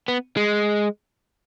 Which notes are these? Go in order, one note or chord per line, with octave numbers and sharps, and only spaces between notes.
B3
G#3